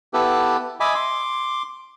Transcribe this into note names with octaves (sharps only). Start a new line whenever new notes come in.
B3 E4 G4 A4 B4
D#5 E5 G#5 B5 D6
C6 D6